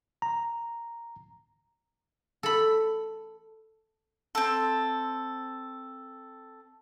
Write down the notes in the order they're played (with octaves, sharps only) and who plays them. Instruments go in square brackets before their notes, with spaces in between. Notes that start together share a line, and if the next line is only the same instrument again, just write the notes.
[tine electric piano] A#5
[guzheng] A4 B5
[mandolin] C4 A4